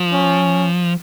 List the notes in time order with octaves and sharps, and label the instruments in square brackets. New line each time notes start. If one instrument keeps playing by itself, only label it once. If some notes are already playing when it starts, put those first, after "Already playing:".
Already playing: [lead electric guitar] F3
[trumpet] C#4